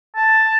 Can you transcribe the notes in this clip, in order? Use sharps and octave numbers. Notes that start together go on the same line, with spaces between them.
A5